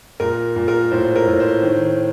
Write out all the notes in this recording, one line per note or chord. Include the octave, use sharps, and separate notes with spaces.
A#2 A#4
A#2
A#4
A2 C5
A#4
A2
C5
D#3